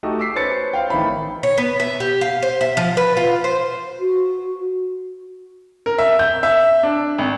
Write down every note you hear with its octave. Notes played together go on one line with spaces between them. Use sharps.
A3 D#4 F#4 G4 A4 D#5
D6 E6 B6 C7
C#4 B4 C5 A6 C#7
C5 C#5 F5 G5
A1 D#3 D#4 E4 B5
C#5
B3
E5
G4
F5
C5
E5
F3
B4
F4
C5
F#4
A#4
E5
G6
E5
D4
G#1